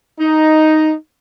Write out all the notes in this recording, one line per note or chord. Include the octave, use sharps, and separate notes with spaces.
D#4